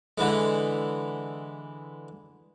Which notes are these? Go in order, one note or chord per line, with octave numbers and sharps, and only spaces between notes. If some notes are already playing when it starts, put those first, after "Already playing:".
D3 E3 G#3